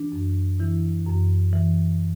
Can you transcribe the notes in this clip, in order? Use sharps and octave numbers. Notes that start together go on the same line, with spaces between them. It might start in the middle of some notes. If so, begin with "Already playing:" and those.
Already playing: E3 D4
F#2
E3 E4
F#2
E3